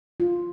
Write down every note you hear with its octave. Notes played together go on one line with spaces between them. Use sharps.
F4